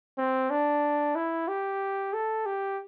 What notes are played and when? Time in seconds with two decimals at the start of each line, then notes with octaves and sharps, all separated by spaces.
0.18 C4
0.50 D4
1.15 E4
1.48 G4
2.13 A4
2.46 G4